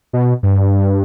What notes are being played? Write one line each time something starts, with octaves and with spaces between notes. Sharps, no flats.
B2
G2